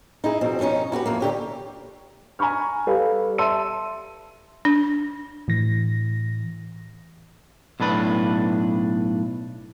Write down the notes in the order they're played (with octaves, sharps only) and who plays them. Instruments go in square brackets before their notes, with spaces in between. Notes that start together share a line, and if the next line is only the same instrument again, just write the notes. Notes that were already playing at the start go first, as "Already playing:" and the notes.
[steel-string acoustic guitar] D#4 E4 G#4
F2 B2 C4
G2 F3 B3 C#4 D#4
E4 F#4 G4 B4
F2 E3 A#3
D3 G4 C#5
[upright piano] G#5 A#5 B5 C#6 F6
G3 A4 B4 F5
E5 A5 C6 E6 D#7
[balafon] D4
[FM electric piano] A2 E3 A#6
[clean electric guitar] B1 A2 D4 B4